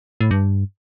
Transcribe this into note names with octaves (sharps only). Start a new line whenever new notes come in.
A2
G2